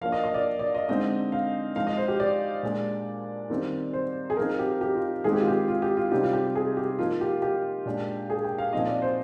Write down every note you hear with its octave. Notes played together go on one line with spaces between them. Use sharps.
F3 A#3 D4 F5
D#5
D#5
D5
D5
D#5
D3 G#3 C4 D#4 D#5
F5
F3 G#3 D#4 F5
D#5
C5
G4
D5
A#2 G#3 D4
D#3 G3 C4 D#4
C5
G#4
F3 C4 D#4 A#4
G4
G4
F4
D#3 G#3 C4 D#4 G#4
G4
F4
G4
F4
G4
F4
C3 G3 C4 D#4 G4
F4
G4
G#4
G4
F3 A#3 D#4 F4
G4
G4
A#2 G#3 D4
G#4
G5
F5
A#2 F3 C4 D#4 D#5
D5
C5